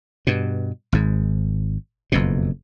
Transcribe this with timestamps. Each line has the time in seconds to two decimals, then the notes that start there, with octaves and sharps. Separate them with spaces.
0.27 G2 B2
0.93 G#1 G#2
2.12 F#1 F2 B2